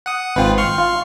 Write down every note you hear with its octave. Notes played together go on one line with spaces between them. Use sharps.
F#5 D#6
G#1 F4 B4 C5 G5
C6 C#6 F6
F4